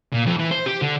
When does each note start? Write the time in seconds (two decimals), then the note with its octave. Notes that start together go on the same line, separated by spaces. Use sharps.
0.14 A#2
0.26 F2
0.39 E3
0.51 C5
0.66 G4
0.82 D3